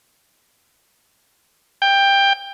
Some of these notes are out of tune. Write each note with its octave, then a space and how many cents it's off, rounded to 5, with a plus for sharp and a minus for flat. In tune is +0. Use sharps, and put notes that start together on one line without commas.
G5 +15